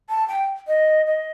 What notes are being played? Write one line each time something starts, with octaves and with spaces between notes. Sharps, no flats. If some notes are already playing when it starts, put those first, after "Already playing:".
A5
G5
D#5
D#5